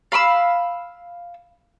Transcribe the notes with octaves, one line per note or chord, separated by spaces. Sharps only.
F5 B5 D6 E6